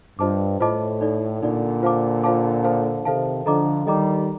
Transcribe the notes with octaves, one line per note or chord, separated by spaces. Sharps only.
G2 F4 C5 D#5 A5 D6
A2 F4 C5 D#5 A5 D6
D#4 A4 D5
A#2 D3 D#4 A4 D5
F4 C5 F5 A5 D6
F4 C5 F5 A5 D6
A4 C5 F5 A5
C3 D#3 A4 C5 F5 A5
D3 F3 A4 D#5 A#5 D6
D#3 G3 A4 D#5 A#5 D6